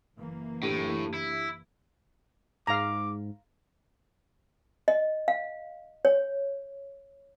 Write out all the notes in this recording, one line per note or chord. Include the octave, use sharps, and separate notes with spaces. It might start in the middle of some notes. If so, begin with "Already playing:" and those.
F#1 E3 A#3
A2 D4 G4 D#7
E4
G#2 F5 A#5 D6
D#5
F5
C#5